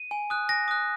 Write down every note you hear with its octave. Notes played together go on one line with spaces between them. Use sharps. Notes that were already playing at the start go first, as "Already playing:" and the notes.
Already playing: D#7
G#5
D#6 F#6
G#5 A#6
D#6 F#6